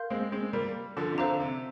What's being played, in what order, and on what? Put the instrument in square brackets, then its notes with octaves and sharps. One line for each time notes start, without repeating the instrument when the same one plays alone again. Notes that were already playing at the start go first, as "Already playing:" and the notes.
Already playing: [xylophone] A#4 F5 C6 G6
[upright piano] G#3 C4
G#3 C4
G3 A#3
D3 F3
C3
[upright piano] D3 [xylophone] C5 F5 A#5
[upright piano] C3